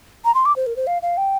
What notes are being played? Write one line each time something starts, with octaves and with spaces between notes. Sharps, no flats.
A#5
C6
D6
C5
A#4
C5
F5
F5
G5